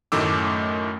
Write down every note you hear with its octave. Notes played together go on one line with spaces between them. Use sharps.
F#2 A2 D#3 A3 D6 E6